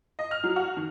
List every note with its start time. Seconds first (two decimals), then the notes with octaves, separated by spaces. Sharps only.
0.19 D#5
0.31 F6
0.44 F#3
0.56 F#4
0.77 D#3